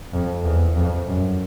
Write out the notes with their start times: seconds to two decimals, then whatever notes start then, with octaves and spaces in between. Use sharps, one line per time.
0.13 F2
0.45 E2
0.76 F2
1.07 F#2